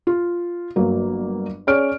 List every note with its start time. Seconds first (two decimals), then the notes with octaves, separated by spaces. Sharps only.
0.07 F4
0.76 G1 F#3 A#3
1.67 C#4 G#4 C#5 D5 F6 D7